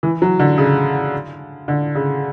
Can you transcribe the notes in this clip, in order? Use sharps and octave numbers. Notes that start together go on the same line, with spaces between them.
E3
F#3
D3
C#3
D3
C#3